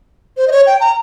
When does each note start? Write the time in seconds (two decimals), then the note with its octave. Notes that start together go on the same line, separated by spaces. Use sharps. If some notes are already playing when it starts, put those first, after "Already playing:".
0.37 C5
0.48 D#5
0.52 C#5
0.66 G5
0.80 A#5